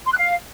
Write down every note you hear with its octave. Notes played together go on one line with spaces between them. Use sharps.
C6
F#6
F5